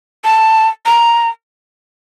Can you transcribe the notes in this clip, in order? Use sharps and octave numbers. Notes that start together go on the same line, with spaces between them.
A5
A#5